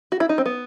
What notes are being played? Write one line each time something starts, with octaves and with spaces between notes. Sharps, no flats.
F#4
E4
D#4
C4
B3